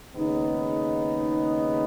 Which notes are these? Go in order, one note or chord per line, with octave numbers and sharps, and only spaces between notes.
D#2 C#3 G#3 B3 D#4